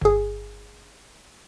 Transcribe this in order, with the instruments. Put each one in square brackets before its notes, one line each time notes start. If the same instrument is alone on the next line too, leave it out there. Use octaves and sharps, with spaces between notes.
[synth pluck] G1 G#4